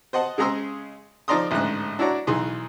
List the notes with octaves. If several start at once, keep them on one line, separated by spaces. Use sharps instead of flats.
C5 D#5 F#5 A5
C#3 G#3 G#4 A#5 C6 E6
F3 D#4 D5 A#5 C6 D#6
A1 D2 G#2 F#6
D4 E4 F#4 C#5 D5 A#5
B1 E3 D#4 G#4 C6